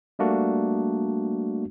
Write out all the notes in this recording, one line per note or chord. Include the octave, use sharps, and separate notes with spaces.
G3 A3 A#3 D4 F#4